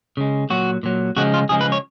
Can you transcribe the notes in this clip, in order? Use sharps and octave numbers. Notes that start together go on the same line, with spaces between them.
C#3 G#3
A#2 F#3 F#4
A#2 F#3
C#3 F3 G#3 F#4
F4
C#3 F3 G#3 G#4
B4
C#5